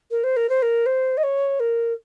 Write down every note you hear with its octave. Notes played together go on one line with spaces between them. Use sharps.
A#4
C5
A#4
C5
A#4
C5
D#5
C#5
A#4